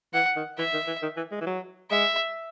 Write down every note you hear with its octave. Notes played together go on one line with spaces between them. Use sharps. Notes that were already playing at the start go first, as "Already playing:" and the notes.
E3 F#5
D#3
E3 E5
D#3
E3
D#3
E3
G#3
E3
F#3
G#3 E5